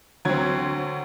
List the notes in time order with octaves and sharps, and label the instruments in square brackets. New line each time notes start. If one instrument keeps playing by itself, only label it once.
[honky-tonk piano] D2 G#6 [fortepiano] F#3 C4